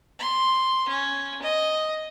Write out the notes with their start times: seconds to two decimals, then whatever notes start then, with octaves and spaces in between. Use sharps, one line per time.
0.19 C6
0.89 C#4
1.43 D#5